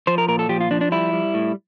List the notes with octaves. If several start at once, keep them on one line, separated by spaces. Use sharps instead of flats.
F3 C5
A#4
A#2 A#4
A4
F3 G4
F4
F3 D4
D4
G3 E4
G3
A2